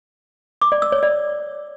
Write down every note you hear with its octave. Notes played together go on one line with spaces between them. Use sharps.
D6
D5
E6
C#5
D5